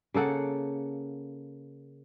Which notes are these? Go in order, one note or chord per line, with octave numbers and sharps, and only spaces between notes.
C#3 A#3 A4 F#5